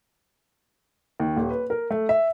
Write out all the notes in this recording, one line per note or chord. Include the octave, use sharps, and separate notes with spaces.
D#2
D#1
B4
A#4
A3
E5